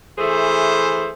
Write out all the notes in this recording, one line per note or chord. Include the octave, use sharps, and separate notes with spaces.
E3 A3 G#4 C5